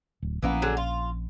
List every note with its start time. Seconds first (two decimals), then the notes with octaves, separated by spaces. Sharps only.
0.22 D1
0.43 A#1 E3 F3 A#3 B3 C#4
0.62 D3 F#3 G#4
0.77 F4